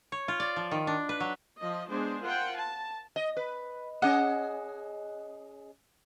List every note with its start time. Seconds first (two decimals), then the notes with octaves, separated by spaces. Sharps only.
0.12 C#5
0.28 F4
0.40 D5
0.56 F3
0.71 D#3
0.87 D4
1.09 B4
1.20 F#3
1.61 F3 D#5
1.89 G#3 B3 D4 G#4 C5
2.22 F4 A#4 C5 F#5 G5
2.56 A5
3.16 D#5
3.37 B4
4.02 C#4 G#4 D#5 F#5